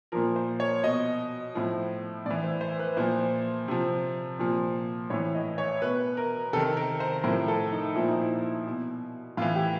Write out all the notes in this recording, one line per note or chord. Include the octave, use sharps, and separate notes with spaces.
A#2 F3 A#4
C5
C#5
B2 D#5
A2 F3
A2 E3 D5
C5
C5
B4
A#2 F3 C5
C3 F3
A#2 F3
A2 E3 C#5
D#5
C#5
B2 B4
A#4
C3 D#3 A4
A#4
C5
A2 F3 A#4
A4
D#4
A#2 F3 E4
D#4
E4
B2
A2 E3 F4
G4